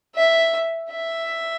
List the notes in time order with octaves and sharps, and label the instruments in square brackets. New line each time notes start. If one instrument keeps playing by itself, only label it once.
[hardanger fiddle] E5
E5